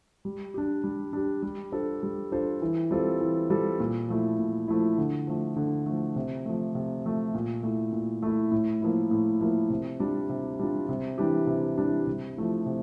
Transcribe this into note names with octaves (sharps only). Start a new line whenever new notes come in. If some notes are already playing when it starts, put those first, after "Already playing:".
G3
D4 G4
G3
D4 G4
G3
D4 F4 A4 C5
G3
D4 F4 A4 C5
E3
G3 C4 F4 A4
E3
G3 C4 F4 A4
A#2
F3 A3 E4
A#2
F3 A3 E4
D3
F3 A3
D3
F3 A3
C3
F3 A3
C3
F3 A3
A#2
A3 E4
A#2
A3 E4
A2
F3 A#3 E4
A2
F3 A#3 E4
C3
G3 D4 F4
C3
G3 D4 F4
C3
E3 G3 D4 G4
C3
E3 G3 D4 G4
C3
F3 A3 E4
C3